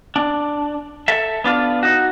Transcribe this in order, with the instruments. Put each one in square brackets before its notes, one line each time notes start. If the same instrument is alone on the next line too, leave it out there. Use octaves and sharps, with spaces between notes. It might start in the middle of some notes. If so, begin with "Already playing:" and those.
[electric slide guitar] D4
A4 E5
B3 D4 F4
D#4 F#4